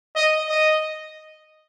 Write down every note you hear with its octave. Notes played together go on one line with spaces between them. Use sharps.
D#5
D#5